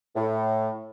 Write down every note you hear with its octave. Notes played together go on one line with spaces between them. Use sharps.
A2